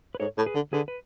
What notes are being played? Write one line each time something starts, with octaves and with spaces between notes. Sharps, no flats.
B4
G#2 A4 C#5
A2
G#4 B4
D3
D3 G#4 B4
B4